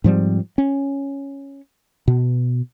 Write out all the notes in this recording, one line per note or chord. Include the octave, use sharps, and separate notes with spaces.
G#2 F3 G3 C4
C#4
B2